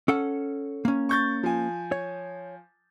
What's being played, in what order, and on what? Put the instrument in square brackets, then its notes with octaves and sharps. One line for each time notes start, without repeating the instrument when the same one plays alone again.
[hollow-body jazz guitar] C#4 A4 F#5
A#3 C#4
[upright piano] C#6 G6 A6
F3 G#5
[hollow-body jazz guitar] C#5